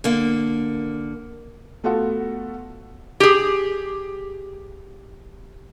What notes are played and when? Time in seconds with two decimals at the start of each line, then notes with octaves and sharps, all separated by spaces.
0.04 D3 A#3
1.84 A3 B3 F4 F#4 A4
3.20 G4 G#4